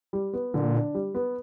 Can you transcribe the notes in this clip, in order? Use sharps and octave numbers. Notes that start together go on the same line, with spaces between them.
G3
B3
A#2 D3
D4
G3
B3